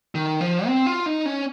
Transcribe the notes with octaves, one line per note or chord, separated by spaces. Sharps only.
D#3
F3
C4
F4
D#4
C#4